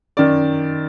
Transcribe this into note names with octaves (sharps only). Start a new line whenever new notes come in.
F#2 D#3 D5